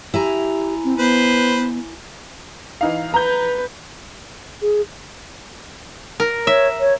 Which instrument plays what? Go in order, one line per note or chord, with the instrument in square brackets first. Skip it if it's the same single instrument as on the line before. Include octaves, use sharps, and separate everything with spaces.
[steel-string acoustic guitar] E4 G#5 A#5 [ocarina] G4
[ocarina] C4
[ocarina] B3 [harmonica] B4 C5
[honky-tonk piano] E3 D#4 F5
[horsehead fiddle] B4 [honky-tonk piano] A#5 G6
[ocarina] G#4
[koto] A#4
[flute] C#5 [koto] E5
[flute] C#5